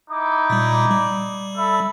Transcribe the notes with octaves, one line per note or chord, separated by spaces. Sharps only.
D#4 E4 D6
A#2 G3
G3
A4 E5 B5